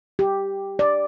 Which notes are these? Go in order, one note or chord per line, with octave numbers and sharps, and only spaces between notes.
G4
D5